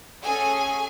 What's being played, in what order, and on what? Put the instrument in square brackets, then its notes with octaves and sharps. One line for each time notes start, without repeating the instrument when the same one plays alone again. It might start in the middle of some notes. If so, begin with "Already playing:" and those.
[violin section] A3 C#4 F#4 G#4 A4 G#5